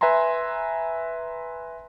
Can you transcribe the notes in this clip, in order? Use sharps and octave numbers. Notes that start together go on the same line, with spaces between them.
B4 E5 G#5 A#5 C6